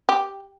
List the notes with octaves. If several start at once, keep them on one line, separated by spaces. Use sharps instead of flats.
G4